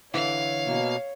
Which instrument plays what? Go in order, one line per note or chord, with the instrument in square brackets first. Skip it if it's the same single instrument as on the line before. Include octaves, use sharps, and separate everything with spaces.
[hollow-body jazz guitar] D3 E3 E4 [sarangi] C#5 [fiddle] F5
[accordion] B2 A#3